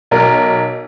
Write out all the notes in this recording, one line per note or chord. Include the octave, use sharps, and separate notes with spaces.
B1 A#4